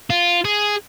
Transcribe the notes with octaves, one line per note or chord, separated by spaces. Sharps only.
F4
G#4